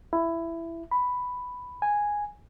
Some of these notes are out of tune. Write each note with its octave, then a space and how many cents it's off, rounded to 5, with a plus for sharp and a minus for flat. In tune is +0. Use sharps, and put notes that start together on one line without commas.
E4 +15
B5 +5
G#5 -5